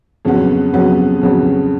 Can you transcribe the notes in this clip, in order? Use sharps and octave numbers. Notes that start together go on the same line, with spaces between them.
F2 C#3 F#3 B3
F2 C#3 F#3 B3
F2 C#3 F#3 B3